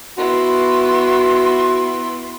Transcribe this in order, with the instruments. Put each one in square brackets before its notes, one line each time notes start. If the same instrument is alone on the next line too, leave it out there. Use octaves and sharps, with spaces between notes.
[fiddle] B3 E4 [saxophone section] F#4 [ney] C6